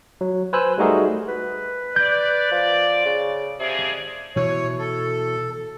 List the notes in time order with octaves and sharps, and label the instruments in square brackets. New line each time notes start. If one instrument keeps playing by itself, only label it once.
[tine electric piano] F#3
B4 C5 G#5 E6 F#6
G3 A3 D#4 F#4 G#4 A#4
[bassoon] B4
[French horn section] D5 [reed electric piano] G6
[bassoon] F3
C#3
[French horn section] F2 G#4 D5 [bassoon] C3
[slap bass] B2 E3 [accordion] C#5
[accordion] A4